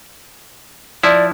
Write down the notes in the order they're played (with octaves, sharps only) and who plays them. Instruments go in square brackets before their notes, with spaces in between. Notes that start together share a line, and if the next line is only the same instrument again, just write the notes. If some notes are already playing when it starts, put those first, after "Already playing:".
[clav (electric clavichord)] F3 E4 [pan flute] D5